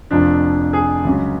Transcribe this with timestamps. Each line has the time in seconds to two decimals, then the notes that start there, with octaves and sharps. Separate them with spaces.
0.11 F1 F2 F3 D4
0.73 G#4
1.05 C#2 C#3 F#3